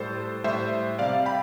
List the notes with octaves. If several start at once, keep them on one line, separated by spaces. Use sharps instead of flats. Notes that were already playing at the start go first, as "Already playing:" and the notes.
Already playing: A2 G3 A4 C5
A2 G3 C5 E5
C3 G3 D5 F5
G5 B5